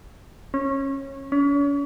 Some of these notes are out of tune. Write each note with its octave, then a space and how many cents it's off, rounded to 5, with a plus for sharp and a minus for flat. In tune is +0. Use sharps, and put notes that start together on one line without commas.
C#4 -20
C#4 +40